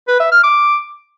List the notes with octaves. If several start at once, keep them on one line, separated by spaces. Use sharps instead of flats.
B4
E5
F6
D6